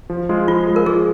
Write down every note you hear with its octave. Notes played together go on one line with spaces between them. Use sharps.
F3
G#3 F4 G#4
F3 F4
G#3 F4 G#4
A#4
F3 G#4